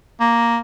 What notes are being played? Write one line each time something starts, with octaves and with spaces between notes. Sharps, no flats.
A#3